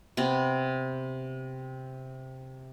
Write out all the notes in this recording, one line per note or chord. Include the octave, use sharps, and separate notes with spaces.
C3 B3 C4